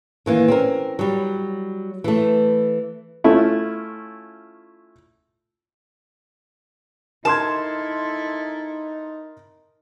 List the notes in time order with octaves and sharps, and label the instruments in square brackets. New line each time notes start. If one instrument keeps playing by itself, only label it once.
[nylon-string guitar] D#3 E3 A#3
C4 C#4 A#4
F#3 G3
E3 A3
[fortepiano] A3 C#4 E4 F4
[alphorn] D#4 [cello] E4 A4 [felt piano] A#4 C6 G#6 [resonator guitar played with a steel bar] A5